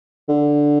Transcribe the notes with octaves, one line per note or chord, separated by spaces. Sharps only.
D3